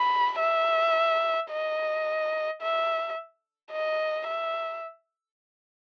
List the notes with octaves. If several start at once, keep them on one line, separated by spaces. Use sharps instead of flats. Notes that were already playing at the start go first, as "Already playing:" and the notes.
Already playing: B5
E5
D#5
E5
D#5
E5